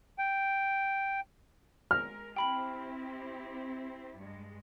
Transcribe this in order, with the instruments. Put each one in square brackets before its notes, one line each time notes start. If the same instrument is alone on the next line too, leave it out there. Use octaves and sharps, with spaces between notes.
[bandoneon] G5
[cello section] G#3 A#4 [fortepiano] F6
[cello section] C4 E4 G4 [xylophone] G5 B5 F#7
[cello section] G2 G#3